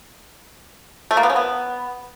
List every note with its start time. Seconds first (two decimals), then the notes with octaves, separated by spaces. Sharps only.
1.11 A3
1.17 A#3
1.23 B3
1.29 C#4
1.36 B3